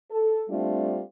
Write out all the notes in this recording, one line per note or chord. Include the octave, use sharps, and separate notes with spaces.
A4
G3 A3 C4 D4 F4